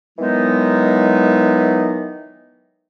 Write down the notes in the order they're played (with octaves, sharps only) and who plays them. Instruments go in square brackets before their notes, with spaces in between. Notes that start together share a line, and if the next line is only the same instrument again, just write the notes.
[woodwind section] D#3 E3 F#3 G#3 B3 D#4